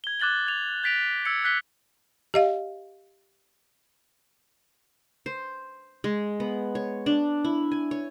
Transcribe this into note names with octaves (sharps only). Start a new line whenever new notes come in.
G#6 G7
D6 F#6 A6 F#7 G7
G#6 F7 F#7
G6 A6 B6 D7 F7
E6 G#6 C#7
F#6 B6 G7
G4 D#5 F5
C5
G#3
B3
C#5
D4
E4
G#5
C#5